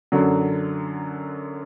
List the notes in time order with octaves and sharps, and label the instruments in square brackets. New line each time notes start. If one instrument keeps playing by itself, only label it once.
[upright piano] F#2 D3 F#3